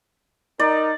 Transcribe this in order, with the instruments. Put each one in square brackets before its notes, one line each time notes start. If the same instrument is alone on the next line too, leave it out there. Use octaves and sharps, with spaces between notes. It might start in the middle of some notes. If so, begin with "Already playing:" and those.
[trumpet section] D#4 A#4 [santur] D5